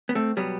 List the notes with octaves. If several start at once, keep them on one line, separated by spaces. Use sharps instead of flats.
B3
A3 C4
B2 F#3 G3 B3